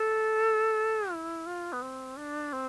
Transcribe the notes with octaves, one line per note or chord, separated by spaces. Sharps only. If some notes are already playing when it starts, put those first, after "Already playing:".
Already playing: A4
E4
F4
B3
C4
D4
C4